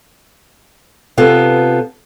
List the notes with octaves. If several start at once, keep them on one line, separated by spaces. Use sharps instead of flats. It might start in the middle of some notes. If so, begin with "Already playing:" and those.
C3 B3 F4 A4